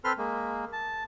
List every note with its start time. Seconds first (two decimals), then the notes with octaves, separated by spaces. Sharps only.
0.04 C4 A4 B4 C6 F6
0.18 G#3 A#3
0.73 A5